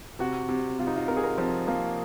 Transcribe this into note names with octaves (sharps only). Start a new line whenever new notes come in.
C3 F#4
C3
C3 F4
D#4
F4
C3 A#4
G#4
A#4
F3 C4
F3 A#3